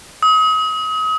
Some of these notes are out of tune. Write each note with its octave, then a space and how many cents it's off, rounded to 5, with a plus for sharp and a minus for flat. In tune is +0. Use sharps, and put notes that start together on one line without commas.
D#6 +35